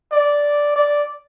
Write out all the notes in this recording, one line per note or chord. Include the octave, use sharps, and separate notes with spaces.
D5
D5